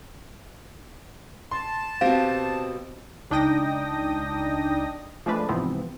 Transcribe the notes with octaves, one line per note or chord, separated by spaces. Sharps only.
A5 C6
B2 C4 G4 F5
C#2 D4 D#4 G5 D#6 A#6
F3 G#3 A3 D4 B4
G#2 C3 E3 F3 B3 C4